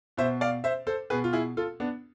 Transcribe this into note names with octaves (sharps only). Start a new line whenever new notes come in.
B2 C5 E5
D5 F5
C5 E5
A4 C5
B2 G#4 B4
F4
E4 G#4
F4 A4
B3 D4